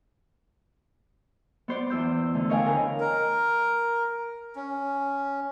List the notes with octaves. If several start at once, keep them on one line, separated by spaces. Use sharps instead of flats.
B3 C5 D5
E2 E6 G6
D3 A3
A#4 C#5 D#5 F5 G5 G#5
D3 A#4 B4
A#4
C#4